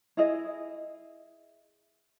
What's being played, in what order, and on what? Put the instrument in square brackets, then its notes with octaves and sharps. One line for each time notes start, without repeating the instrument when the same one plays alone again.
[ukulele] E4 G#4 D#5